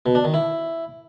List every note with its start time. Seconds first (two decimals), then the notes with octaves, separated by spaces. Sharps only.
0.06 B2
0.15 D4
0.24 D#3
0.34 E4